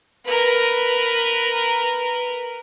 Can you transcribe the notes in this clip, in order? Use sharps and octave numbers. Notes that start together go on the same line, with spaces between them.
A#4 B4